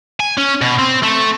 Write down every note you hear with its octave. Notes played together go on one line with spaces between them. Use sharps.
G#5
C#4
B2
C4
A3